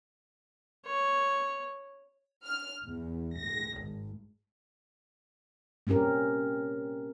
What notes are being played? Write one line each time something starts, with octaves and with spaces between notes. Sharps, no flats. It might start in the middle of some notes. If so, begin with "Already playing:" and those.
C#5
F6
E2
A#6
G#1
A#3 C4 C#4 G4 A#4